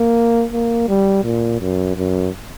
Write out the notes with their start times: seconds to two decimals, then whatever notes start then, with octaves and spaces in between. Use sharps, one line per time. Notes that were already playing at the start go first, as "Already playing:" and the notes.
Already playing: A#3
0.53 A#3
0.88 G3
1.24 A#2
1.61 F#2
1.97 F#2